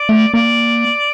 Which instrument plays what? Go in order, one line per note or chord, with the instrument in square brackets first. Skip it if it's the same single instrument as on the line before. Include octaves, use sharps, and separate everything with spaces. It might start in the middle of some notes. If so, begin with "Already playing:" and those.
Already playing: [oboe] D5
[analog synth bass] A3
[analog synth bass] A#3 [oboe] D5